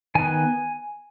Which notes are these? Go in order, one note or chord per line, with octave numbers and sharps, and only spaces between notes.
D#3 B3 G#5